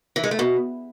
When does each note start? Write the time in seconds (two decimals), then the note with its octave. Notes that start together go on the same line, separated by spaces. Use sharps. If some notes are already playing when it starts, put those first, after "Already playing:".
0.16 E3
0.24 G#3
0.31 A3
0.39 B2